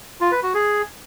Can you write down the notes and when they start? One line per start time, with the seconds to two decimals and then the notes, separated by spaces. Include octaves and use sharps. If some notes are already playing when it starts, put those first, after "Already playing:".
0.21 F4
0.32 B4
0.43 F#4
0.54 G#4